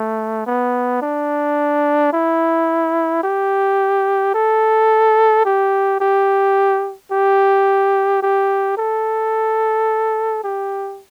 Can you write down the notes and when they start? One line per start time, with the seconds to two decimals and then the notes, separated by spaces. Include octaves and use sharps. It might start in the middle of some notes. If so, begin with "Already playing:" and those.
Already playing: A3
0.47 B3
1.02 D4
2.13 E4
3.24 G4
4.34 A4
5.45 G4
6.01 G4
7.12 G4
8.22 G4
8.78 A4
10.44 G4